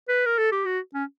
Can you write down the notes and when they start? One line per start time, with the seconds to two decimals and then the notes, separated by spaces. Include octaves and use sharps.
0.09 B4
0.26 A#4
0.38 A4
0.52 G4
0.66 F#4
0.94 C#4